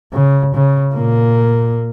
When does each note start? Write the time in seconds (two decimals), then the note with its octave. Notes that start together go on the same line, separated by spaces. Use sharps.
0.13 C#3
0.55 C#3
0.94 A#2 A#3